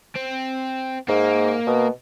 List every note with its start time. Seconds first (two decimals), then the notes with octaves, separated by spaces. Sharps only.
0.15 C4
1.09 G#2 A#3
1.67 B2